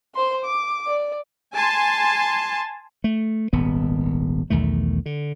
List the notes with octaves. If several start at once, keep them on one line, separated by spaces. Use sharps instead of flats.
C5 C6
D6
D5
G#5 A5 C6
A3
D#1 G#1 B3
B1 E2 D#3 A3
D3